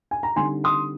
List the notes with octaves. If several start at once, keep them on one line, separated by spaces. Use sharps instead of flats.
G#5
A#5
D3 G3 C4 D#4 G#5 C6
C6 D#6